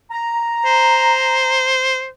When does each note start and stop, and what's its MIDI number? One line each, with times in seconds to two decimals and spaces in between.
0.11 1.69 82
0.65 2.08 72